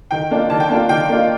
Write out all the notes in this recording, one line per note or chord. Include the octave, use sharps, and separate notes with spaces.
D#3 G5
A#3 D4 F4
D#3 A5
G5
A#3 D4 F4 A5
D#3 G5
A#3 D4 F4